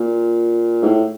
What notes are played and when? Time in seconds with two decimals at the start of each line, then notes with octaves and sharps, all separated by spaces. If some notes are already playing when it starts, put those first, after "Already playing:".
Already playing: A#2
0.82 G#2
0.85 A2